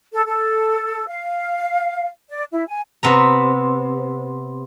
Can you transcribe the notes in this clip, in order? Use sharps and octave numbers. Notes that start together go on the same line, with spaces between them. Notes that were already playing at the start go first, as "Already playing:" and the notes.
A4
A4
F5
D5
E4
G#5
C3 B3 A#5